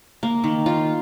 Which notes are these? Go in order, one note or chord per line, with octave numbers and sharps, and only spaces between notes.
A#3
D#3
F4